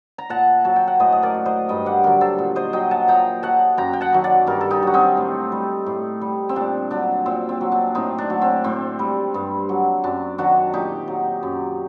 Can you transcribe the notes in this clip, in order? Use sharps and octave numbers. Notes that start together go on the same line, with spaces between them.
A#5
A#2 F#5 A5
F#3 A5
G5
F#5
A2 C5 D#5
D#5
A#4 D5
F#3
C5 D#5
G2 D#5 G5
D5 F#5
D3 F#3 G4 A#4
A4 C5
A#2
C5 D#5
F#3 D#5 G5
F#5 A5
A#2 G5 A#5
F#3 F#5 A5
F#2 G5 A#5
G5
F#5 A5
D#3 F#3
D5 F#5
G2 G4 A#4
A4
D#4 G4
F#3 F#4
C4 D#4
A2
G3
A2
G3
C4
A#2 D4
F#3 D4
A#2 C4
C4
F#3
D4
A2 C4 D#4
D4
F#3
C4
A2 C4
G3
G2
F#3
F#2 D4
D#3 F#3 D4 F#4
A#2 D#4 G4
F#3
F#2